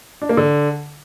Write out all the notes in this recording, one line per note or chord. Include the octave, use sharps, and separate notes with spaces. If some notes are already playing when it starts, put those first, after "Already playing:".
D4
A#3
D3